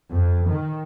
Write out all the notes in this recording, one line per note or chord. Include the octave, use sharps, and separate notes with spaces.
F2
D#3